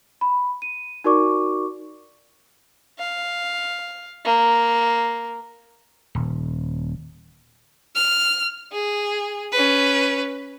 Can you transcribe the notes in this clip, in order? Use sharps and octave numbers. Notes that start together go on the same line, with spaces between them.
B5
D#7
D#4 F#4 A#4 D5 C#6 D6
F5
A#3
D#1
F6
G#4
C#4 B4